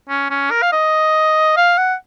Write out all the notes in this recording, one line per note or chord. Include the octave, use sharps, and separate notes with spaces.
C#4
C#4
A#4
F5
D#5
F5
F#5